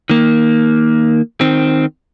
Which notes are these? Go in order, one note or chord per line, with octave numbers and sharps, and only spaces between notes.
D#3 A#3
D#3 C4